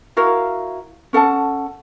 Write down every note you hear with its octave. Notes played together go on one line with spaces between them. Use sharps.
E4 F#4 A#4 F5
C#4 A4 F#5 A5